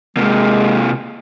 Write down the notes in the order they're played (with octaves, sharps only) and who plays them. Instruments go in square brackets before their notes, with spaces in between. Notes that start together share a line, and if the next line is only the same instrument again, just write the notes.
[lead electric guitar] C3 A#3 [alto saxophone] G#3